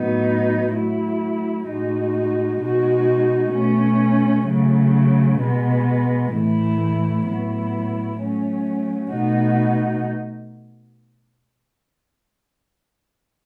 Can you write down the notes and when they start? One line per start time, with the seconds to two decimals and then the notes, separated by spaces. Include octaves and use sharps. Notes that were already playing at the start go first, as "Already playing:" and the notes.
Already playing: A2 F#3 B3 D#4
0.73 F#3 A3 E4
1.66 A2 G#3 D#4 F#4
2.59 B2 G#3 D#4 F#4
3.52 B2 A3 C#4
4.45 C#3 F#3 A3
5.38 B2 G#3 B3
6.32 A2 E3 A3 E4
7.25 A2 F#3 B3 E4
8.17 F#3 A3 C#4
9.11 B2 A3 D#4 F#4